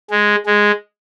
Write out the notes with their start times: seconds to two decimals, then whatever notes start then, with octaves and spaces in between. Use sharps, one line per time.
0.10 G#3
0.46 G#3